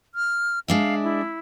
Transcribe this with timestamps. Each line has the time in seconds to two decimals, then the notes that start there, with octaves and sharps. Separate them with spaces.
0.15 F6
0.68 G#3 D4 E5 F5
1.04 E4